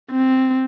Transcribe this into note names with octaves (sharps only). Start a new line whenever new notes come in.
C4